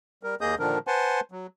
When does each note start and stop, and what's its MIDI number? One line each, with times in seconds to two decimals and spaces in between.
0.23 0.35 55
0.23 0.35 70
0.41 0.55 39
0.41 0.55 58
0.41 0.55 68
0.41 0.55 75
0.41 0.55 87
0.41 0.55 91
0.59 0.78 46
0.59 0.78 50
0.59 0.78 51
0.59 0.78 53
0.59 0.78 62
0.59 0.78 70
0.87 1.20 71
0.87 1.20 72
0.87 1.20 78
0.87 1.20 80
0.87 1.20 81
0.87 1.20 84
1.32 1.47 54